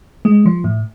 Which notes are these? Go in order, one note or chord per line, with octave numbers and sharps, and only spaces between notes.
G#3
F3
A2